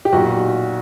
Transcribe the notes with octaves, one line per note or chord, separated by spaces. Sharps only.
G4
B1 A#2 F#4